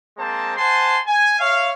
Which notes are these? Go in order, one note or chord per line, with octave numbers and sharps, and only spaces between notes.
G#3 A#3 C4 C5 A5
C5 F#5 G#5 A5 C6
G#5
C#5 E5 F5